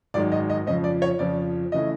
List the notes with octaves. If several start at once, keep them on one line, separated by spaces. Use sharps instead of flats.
G#1 F#2 D#3 G#3 D5
D#5
D#5
F2 C#3 F3 D#5
D5
C#5
F2 C#3 F3 D5
C#3 E3 A3 D#5